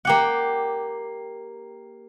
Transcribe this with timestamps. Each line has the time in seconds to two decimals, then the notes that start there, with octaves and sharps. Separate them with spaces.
0.05 A#3 G4 F#5